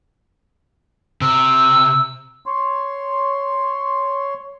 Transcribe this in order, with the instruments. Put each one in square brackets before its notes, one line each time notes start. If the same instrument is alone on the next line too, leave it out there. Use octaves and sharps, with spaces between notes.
[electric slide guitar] C3 [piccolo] E6
[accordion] C#5 C6